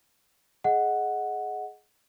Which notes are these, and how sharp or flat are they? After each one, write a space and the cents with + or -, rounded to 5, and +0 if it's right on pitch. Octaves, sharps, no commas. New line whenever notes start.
G#4 +20 D#5 +5 F#5 -5